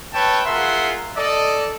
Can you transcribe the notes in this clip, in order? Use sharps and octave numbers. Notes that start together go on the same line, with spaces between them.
B4 C#5 E5 G5 A5
F4 G#4 A#4 E5 F#5 C6
A4 D5 D#5